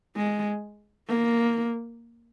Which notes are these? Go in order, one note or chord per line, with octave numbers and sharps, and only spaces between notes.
G#3
A#3